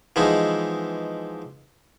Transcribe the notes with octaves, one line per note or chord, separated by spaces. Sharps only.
E3 F3 G#3 B3 D#4